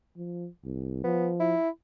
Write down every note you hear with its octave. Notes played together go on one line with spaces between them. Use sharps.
F3
C2
F3 B3
E4